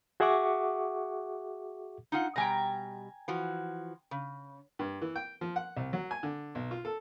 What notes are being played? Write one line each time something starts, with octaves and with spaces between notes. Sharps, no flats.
F#4 G#4 E5 F#5 C#6 D6
D#4 F4 F#5
B2 G3 G5 G#5 A#5
E3 F3 F#4
C#3
G2
E3
G5
F3
F#5
C2
F#3
G#5
D3
B1
F4
A4